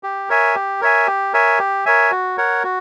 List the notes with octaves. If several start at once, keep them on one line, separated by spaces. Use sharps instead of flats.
G4
A#4 C#5 E5 G#5
G4
A#4 C#5 E5 G#5
G4
A#4 C#5 E5 G#5
G4
A#4 C#5 E5 G#5
F#4
A#4 C#5 F#5
F#4